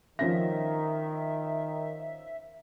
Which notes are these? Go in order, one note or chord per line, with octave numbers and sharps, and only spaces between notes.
D#3 F3 C#4 E5 A#6